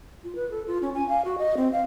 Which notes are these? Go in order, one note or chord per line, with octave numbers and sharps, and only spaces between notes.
F4
B4
A4
F4
C#4
G#5
F5
F#4
D#5
C4
F5